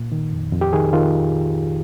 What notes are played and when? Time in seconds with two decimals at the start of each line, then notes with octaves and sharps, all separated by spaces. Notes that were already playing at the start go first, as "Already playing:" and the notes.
Already playing: A#2
0.12 D#3
0.33 F2
0.52 F2
0.61 G4
0.73 D#3 G#4
0.93 D#3 F4